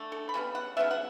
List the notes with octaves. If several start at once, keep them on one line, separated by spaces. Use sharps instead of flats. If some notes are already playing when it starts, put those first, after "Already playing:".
Already playing: D3 A3
A4
B5
C#3 G3 B3
F#5
C#3 F#3 B3 E5
F#5